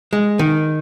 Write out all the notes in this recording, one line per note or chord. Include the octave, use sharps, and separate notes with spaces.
G#3
D#3